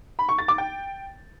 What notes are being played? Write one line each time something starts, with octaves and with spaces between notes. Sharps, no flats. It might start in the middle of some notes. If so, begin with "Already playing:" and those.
B5
C#6
A6
D6
G5